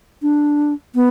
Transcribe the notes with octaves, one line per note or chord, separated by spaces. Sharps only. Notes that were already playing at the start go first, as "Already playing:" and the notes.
D4
B3